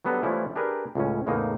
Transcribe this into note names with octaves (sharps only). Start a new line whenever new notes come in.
F#3 G3 B3 D4 A4 A#5
E3 F3 G3 A3 C#4 E4
D4 G4 G#4 A#4 B4
C#2 A2 C#4
E2 A2 C#3 A#3 D#4